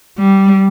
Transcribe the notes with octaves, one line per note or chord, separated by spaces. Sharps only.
G3